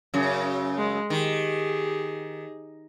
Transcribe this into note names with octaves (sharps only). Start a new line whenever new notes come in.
F#2 C#3
G#3
D#3 G4 G#4